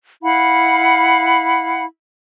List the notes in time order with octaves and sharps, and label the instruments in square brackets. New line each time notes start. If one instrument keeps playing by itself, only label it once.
[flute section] E4 F5 F#5 B5